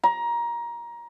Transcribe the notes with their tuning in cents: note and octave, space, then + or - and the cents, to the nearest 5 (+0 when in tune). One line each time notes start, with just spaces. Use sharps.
A#5 +20